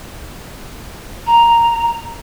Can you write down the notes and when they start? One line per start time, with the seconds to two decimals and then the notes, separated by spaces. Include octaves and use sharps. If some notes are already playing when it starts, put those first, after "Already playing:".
1.27 A#5